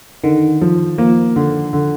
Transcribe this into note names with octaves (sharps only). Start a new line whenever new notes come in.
D3 D#3
F3
F3 A#3
D3
D3